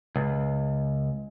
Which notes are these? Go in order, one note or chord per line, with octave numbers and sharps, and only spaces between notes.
C#2